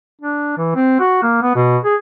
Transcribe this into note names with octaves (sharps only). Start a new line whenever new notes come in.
D4
E3
C4
F#4
A#3
B3
B2
G#4